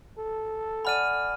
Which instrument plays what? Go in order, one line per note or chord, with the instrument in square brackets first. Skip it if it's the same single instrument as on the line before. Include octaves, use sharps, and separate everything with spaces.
[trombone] A4
[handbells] D5 F#5 G#5 [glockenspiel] B5 F6 D#7